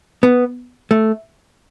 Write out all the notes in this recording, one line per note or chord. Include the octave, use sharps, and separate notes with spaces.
B3
A3